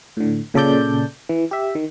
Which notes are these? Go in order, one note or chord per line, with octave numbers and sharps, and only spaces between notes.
A2 D3
A#2 C#3 A4 D5 G6
E3
G4 E5
D#3